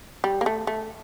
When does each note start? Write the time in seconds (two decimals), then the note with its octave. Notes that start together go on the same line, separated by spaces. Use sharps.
0.24 G3
0.41 A#3
0.46 A3
0.67 A3